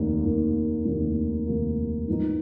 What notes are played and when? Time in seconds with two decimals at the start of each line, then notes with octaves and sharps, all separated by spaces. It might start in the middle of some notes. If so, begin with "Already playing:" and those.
Already playing: F1 D#2 D#3 A#3
0.24 F1 D#2 D#3 A#3
0.85 F1 D#2 D#3 A#3
1.47 F1 D#2 D#3 A#3
2.07 G#2 F3 B3 D#4